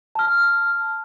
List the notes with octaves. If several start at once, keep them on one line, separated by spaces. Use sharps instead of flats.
A5 F6